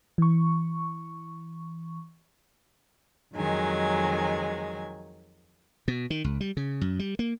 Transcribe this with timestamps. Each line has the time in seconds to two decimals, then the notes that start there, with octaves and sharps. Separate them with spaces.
0.18 E3 C#6
3.35 F2 D#3 F#3 G#3 G#5
5.88 B2
6.10 D#3
6.24 C#2
6.41 G3
6.57 C#3
6.81 F#2
6.99 G3
7.19 A#3